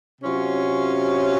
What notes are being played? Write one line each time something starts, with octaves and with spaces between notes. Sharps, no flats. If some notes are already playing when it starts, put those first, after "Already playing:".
C3 F#3 C#4 F4